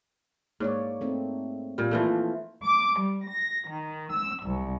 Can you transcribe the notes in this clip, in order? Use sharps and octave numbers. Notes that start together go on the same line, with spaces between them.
G#2 A#3 C#5 D5
A3 C4 D#4
A#2 G3
E3 F3 A3 A#3 F4
D6
G3
A#6
D#3
E6
C2